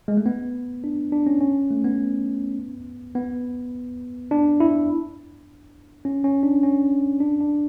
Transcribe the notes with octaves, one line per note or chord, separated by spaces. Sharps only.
G#3
A3
B3
D4
D4
C#4
C#4
A3
B3
B3
D4
E4
C#4
C#4
D4
C#4
D4
D4